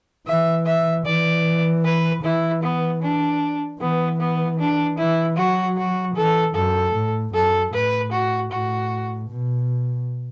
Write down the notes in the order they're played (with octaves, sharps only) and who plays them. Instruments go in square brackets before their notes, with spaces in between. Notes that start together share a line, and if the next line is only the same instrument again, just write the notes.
[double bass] E3 [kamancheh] E5
[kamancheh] E5
[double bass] E3 [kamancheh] D5
[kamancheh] B4
[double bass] E3 [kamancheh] E4
[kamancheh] B3
D4
[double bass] E3 [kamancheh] B3
[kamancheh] B3
D4
[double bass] E3 [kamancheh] E4
[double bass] F#3 [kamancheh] F#4
[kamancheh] F#4
[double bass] E3 [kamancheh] A4
[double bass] F#2 [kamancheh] A4
[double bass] A2
[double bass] F#2 [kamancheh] A4
[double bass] A2 [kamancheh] B4
[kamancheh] F#4
[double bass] A2 [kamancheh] F#4
[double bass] B2